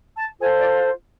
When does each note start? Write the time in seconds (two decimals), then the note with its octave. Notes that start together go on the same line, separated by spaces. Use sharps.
0.16 A5
0.40 F4 A4 C5 G#5
0.58 D5